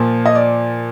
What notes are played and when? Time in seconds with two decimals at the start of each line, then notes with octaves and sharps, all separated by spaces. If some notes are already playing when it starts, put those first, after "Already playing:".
Already playing: A#2 F3
0.25 D#5
0.35 D5